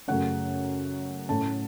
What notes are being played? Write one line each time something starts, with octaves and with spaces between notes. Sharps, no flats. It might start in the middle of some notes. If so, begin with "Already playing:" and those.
F#2 C#3 A3 C#4 F#5
A2 A3 C#4 A5